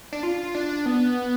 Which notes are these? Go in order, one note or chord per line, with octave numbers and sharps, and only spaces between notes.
D4
F4
D4
B3